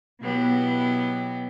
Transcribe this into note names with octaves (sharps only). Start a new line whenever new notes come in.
B2 F#3 B3 E4 G4